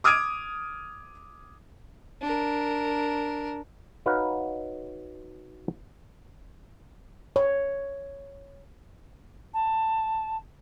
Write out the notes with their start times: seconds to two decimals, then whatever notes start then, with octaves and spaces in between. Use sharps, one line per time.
0.04 D6 D#6 F6 G#6 D7 D#7
2.22 D4 A#4
4.06 D#4 F#4 B4 C#5 F5
7.36 C#5
9.53 A5